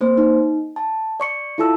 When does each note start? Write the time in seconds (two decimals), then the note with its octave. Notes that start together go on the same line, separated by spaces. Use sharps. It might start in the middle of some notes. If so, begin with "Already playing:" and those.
0.01 A#3 C4 C5
0.17 D#4
0.76 A5
1.20 D5 C#6 C#7
1.58 E4 F4 A4 A5 E6